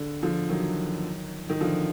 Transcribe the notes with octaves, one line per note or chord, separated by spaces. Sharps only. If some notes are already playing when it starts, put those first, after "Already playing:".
Already playing: D3
D3 F3
D#3 F#3
D#3
D3 F3